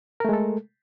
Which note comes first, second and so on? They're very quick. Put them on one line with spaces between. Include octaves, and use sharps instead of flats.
A#4 A3 G#3 A4